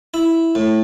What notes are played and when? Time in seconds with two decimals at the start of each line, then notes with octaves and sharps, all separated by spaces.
0.14 E4
0.55 A2